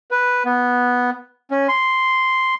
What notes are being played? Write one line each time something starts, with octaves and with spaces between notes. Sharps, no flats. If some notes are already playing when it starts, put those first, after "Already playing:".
B4
B3
C#4
C6